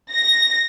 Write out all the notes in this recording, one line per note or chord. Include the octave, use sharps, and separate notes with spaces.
A#6